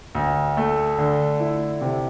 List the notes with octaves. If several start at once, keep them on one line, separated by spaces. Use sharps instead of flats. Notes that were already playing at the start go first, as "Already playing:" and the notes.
D2
A3
D3
E4
C3